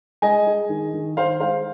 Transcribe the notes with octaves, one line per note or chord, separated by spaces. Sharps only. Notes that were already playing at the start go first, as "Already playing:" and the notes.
G#3 D#5 G#5
G#3
D#3
D#3
D#3 C5 F5
G#3 C5 F5